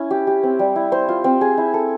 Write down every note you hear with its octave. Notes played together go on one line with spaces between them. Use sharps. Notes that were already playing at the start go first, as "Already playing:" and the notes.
Already playing: C#4 E4
G4
G4
C4
G3
E4
C5
F4
C4
G#4
E4
A4